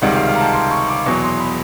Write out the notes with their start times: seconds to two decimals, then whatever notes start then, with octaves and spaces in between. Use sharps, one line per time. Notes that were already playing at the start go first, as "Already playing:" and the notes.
0.02 C#2 C3 D#3 G3 F#5
0.15 F5
0.27 F5
0.35 A#5
0.41 A5
0.53 C6
0.71 C#6
0.89 D6
1.06 E2 B2 F#3 C#6
1.23 C6
1.40 B5